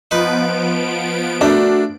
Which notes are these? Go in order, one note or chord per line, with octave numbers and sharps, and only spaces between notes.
F3 B3 D#4 B4 D7
A3 D4 F#4 A#4